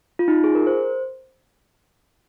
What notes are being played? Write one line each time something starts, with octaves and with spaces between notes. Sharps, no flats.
F4
D#4
F4
G#4
A#4
C5